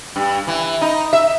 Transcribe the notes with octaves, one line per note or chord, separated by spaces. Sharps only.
G2
E3
D#4
E5